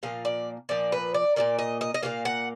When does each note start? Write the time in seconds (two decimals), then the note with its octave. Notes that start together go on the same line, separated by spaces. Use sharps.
0.03 A#2 F3 A#3 F5
0.25 D5
0.69 A#2 F3 A#3 D5
0.92 B4
1.14 D5
1.36 A#2 F3 A#3 D5
1.59 D#5
1.81 D#5
1.94 D#5
2.03 A#2 F3 A#3 F5
2.25 F#5